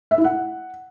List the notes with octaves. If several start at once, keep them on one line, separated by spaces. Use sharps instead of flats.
E5
E4
F#5